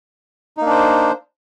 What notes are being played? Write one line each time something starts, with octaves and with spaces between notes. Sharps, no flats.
A#3 D4 D#4 C5